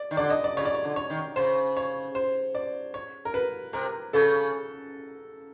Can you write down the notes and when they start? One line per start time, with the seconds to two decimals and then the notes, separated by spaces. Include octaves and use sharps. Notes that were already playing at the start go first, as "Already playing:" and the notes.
Already playing: D5
0.11 D#3
0.17 D3 D5
0.30 D#5
0.44 D5
0.57 C#3 C#5
0.65 D5
0.75 C#5
0.84 D3
0.96 C#5
1.10 D#3
1.36 C#3 C5
1.77 C#5
2.15 C5
2.55 D5
2.94 C#5
3.25 A#4
3.34 B4
3.73 C3 A#4
4.13 C#3 A4